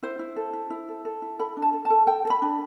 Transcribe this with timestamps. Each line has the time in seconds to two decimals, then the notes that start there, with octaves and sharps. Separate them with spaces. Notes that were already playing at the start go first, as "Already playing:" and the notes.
0.03 E4 C5
0.19 E4
0.36 A4
0.53 E4
0.70 E4
0.89 A4
1.05 A4
1.22 E4
1.39 A4 B5
1.57 D4
1.62 A5
1.73 A4
1.85 A5
1.90 A4
2.07 A4 G5
2.25 A4
2.30 B5
2.42 D4